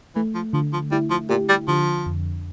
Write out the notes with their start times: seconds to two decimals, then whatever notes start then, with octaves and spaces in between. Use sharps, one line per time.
0.15 E3 A3
0.35 F3
0.53 D3 F3
0.73 F3
0.92 G3 E4
1.10 F3
1.29 A#2 G4
1.49 G3
1.68 D3 F3
2.06 F2